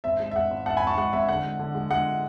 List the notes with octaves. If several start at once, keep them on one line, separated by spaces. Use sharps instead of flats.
G#1 E5
G#3
E5
G#3 F#5
G#1
G#1 F#5 A5
G#5 B5
G#1
A5 C#6
G#3 F#5
G#1 E5
D3 F#5
G#3
D3
G#3
G#3 F#5